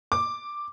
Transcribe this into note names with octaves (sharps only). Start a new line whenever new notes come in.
D6